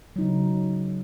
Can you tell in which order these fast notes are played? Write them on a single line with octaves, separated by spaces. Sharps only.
F#3 D#4 C#3